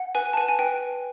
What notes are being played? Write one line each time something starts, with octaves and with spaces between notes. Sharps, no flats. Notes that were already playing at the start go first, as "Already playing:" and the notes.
Already playing: F#5
B4 G#5
A5
B4 G#5
G#5
B4 G5